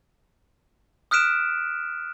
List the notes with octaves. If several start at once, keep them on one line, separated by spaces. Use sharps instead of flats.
D#6 F6 F#6 B6 D7 E7